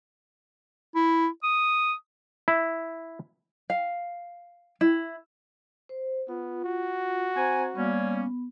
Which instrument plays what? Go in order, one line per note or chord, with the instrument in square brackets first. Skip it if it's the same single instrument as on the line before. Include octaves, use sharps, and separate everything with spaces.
[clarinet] E4
D#6
[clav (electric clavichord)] E4
[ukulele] F5
E4
[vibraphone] C5
[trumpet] B3 [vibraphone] F4
[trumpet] F#4
[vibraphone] C4 C5 A#5 [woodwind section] G#5
[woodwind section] G3 A#3 C#4 [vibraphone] B3